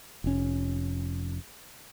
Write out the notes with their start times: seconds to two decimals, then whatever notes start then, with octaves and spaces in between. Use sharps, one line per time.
0.24 F1 C#4